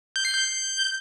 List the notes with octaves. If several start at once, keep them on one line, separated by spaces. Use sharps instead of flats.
G6
C7
G6